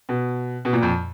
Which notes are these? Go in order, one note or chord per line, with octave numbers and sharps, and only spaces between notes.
B2
B2
A#2
F2